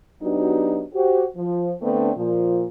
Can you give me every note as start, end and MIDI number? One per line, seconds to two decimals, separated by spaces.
0.22 0.82 54
0.22 0.82 59
0.22 0.82 62
0.22 0.82 63
0.22 0.82 66
0.22 0.82 67
0.94 1.24 66
0.94 1.24 67
0.94 1.24 72
1.37 1.72 53
1.82 2.11 50
1.82 2.11 57
1.82 2.11 59
1.82 2.11 60
1.82 2.11 62
2.17 2.65 46
2.17 2.65 53